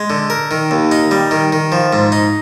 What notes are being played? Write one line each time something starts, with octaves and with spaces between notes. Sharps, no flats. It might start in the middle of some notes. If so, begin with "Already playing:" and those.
Already playing: G#3
D3
A#4
D#3
D#2
D#4
G3
D#3
D#3
F3
G#2
D#4